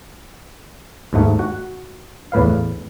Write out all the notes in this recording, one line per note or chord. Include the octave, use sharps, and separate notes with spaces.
D#2 G#2 A3
F#4 F#5
E2 A2 B4 F5